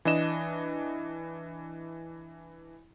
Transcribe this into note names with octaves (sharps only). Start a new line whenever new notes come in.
E3 D4 D#5 E7